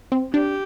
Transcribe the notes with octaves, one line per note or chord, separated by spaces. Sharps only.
C4
D4 G4